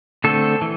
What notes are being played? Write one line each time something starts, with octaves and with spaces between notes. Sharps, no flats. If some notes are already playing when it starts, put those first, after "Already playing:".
D3 A3 C4 A4
E3